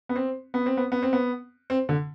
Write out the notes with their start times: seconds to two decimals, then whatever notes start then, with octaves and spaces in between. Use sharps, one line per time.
0.09 B3
0.16 C4
0.54 B3
0.66 C4
0.77 B3
0.92 B3
1.03 C4
1.13 B3
1.70 C4
1.89 D3